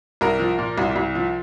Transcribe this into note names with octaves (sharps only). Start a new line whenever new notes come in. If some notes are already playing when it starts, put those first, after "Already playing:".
C2 A#4
F3
A#2
C2
C2
F3